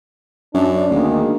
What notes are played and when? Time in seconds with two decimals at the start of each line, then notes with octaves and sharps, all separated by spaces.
0.54 F#2 D4
0.90 D2 D#3 G#3 A#3